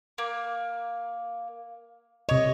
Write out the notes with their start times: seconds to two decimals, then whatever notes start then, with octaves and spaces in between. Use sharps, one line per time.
0.18 A#3
2.29 C3 C#5 D#5